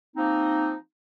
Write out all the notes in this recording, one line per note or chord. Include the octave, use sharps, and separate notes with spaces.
F3 A#3 C4 D#4